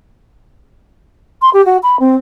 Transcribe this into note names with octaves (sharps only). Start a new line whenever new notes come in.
C6
G4
F#4
B5
C4